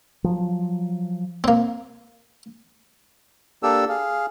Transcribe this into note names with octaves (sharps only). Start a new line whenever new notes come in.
F3 F#3
A#3 C4
A#3 D4 G4 A4 E6
G#4 F5